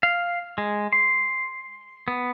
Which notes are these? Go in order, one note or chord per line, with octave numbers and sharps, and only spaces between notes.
F5
G#3
C6
B3